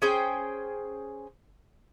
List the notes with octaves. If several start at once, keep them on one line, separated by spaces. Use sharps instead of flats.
C#4 G#4 C5 G5